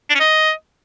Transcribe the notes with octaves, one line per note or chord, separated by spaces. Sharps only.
D4
C#4
D#5